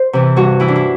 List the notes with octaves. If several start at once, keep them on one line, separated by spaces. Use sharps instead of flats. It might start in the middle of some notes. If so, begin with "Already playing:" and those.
Already playing: C5
C3 E3
G2 F#4
E3 E4
D4
E4